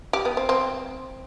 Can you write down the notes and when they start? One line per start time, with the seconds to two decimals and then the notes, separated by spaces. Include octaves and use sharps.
0.13 G4
0.25 B3
0.37 C4
0.49 C4